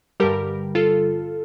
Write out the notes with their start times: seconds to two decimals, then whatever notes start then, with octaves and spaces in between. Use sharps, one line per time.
0.20 G2 D3 G3 G4 A#4
0.75 F4 A4